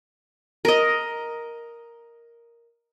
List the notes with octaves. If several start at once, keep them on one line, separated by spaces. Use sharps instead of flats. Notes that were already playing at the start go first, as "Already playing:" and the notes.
A#4 D#5